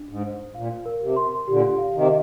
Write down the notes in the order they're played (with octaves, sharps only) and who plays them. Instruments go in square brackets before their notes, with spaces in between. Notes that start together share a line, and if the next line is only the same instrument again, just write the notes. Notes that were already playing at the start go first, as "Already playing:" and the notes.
Already playing: [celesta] D4
[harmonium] G#2
[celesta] C5
[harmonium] A#2 [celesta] F5
[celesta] A#4
[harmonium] C3
[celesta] C6
[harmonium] A#2 D3 [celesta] G4
[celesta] F5
[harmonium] C3 D#3